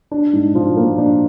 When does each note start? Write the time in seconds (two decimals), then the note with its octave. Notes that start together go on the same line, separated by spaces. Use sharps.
0.11 D4
0.33 G#2
0.55 F3
0.77 A#3
0.98 D4